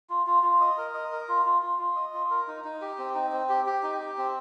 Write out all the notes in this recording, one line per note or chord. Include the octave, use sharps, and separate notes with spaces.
F4
F4
F4
D#5
A#4
D#5
A#4
F4
F4
F4
F4
D#5
F4
A#4
D#4
D#4
G4
C4
D#4
C4
G4
G4
D#4
G4
C4